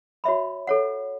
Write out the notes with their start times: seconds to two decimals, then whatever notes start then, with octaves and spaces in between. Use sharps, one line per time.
0.24 F#4 C#5 E5 B5
0.67 A4 C#5 F#5